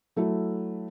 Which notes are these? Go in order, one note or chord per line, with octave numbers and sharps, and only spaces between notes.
F#3 A3 E4 F#4